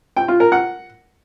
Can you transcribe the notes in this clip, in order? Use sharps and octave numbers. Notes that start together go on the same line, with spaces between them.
G5
F4
A#4
F#5